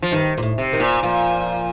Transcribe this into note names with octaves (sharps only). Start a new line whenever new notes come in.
F3
G2 D#3
A#2
A2
C3
D#3
A#2
A#2 F3